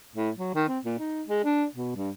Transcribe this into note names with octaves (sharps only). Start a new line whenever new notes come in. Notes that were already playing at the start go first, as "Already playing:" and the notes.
A2
F#3
D#3
C4
A#2
D#4
G#3
D4
B2
G2